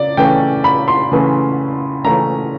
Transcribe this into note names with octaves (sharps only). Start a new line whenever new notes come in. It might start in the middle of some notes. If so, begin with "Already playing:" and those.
Already playing: C#3 D5
C#3 E3 A3 C#4 G5
B5
C6
C#3 E3 A3 C#4
C#3 E3 A3 C#4 A#5